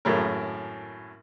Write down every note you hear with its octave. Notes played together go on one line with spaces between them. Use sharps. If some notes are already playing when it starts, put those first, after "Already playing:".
G#1 F#2 A2 G#4 A#4